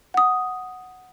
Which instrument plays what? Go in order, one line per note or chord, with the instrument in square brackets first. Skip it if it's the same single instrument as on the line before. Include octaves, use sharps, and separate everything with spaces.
[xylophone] F#5 D#6